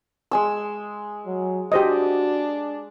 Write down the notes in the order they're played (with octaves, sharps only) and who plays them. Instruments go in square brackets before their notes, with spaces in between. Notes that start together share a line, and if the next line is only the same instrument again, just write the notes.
[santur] G#3 G#5 E6
[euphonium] F#3
[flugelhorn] D4 [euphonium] F#4 [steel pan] G4 C5 D#5